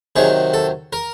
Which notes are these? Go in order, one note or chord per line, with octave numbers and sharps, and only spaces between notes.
C3 D#3 F#3 G#4
A4
A#4